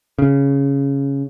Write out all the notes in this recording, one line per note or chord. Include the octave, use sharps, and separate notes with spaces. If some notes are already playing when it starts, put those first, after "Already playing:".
C#3